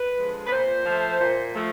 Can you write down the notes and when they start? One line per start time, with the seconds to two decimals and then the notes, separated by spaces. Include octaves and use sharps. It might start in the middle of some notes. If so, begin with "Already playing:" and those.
Already playing: B4
0.17 D3 F3 G#3
0.47 B4
0.51 A#2 C5
0.85 F3 A3
1.20 A#2
1.54 F3 A3